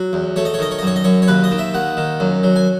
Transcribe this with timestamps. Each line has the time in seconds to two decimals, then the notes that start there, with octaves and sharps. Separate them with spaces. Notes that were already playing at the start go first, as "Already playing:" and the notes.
Already playing: F#3
0.13 E2
0.36 A3 C#5
0.45 D#5
0.54 C#5
0.59 D#3 D#5
0.71 C#5
0.79 D#5
0.82 F#2 C#5
0.96 D#5
1.04 F#2 C#5
1.22 C#5
1.28 D#2 B4
1.44 D#5
1.51 D#3
1.58 E5
1.74 D#2 F#5
1.97 D#3
2.20 F#2
2.44 F#3
2.56 G#5